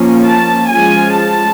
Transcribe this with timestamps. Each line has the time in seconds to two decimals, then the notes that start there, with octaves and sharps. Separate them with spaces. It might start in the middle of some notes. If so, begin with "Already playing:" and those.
Already playing: F3 A#3 C#4
0.25 A5
0.71 F3 G#3 C#4 F4 G#5
1.17 A5